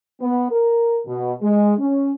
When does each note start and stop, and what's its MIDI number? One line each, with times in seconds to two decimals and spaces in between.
0.21 0.49 59
0.51 0.99 70
1.07 1.33 47
1.42 1.73 56
1.79 2.13 61